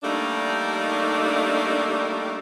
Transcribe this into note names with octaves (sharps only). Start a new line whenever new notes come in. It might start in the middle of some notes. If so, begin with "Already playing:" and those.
G3 A3 A#3 D4 D#4